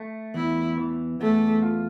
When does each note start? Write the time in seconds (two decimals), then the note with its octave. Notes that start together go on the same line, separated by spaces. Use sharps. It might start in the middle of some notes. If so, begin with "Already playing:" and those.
Already playing: A3
0.34 E2 E4
0.78 E3
1.20 E2 A3
1.62 F4